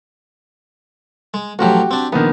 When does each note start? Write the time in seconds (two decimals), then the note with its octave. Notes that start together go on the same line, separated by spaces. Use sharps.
1.34 G#3
1.59 A1 F3 F#3 F#4 G4
1.91 C4 D4
2.13 A#1 D#3 B3